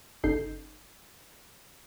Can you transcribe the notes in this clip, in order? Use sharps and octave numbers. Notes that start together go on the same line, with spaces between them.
G1 C#3 D#4 A4 G6 C7